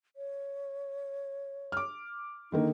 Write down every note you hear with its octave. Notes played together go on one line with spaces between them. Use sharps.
C#5
D6 F6
D3 D#3 A#3 D#4